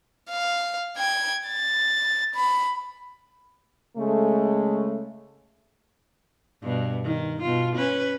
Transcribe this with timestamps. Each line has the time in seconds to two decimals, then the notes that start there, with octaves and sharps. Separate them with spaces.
0.30 F5
0.97 G5 G#6
1.48 A6
2.35 B5
3.97 C#3 G#3 A3
6.63 G2 B2
7.04 D#3
7.42 B2 F4
7.76 C#4 B4